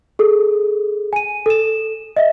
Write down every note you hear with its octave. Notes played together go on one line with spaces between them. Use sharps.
G#4 A4
G#5 D#7
A4 E7
D#5 E5